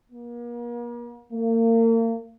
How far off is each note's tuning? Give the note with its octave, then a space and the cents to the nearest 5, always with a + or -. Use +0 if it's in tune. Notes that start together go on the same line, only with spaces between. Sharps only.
A#3 +40
A#3 -35